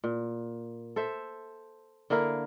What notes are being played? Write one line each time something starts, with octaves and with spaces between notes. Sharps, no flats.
A#2
A4 C5 E5
D3 A#3 E4 A#4